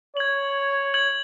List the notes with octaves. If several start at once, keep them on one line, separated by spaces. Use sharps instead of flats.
C#5 G#6 F#7
G#6 F#7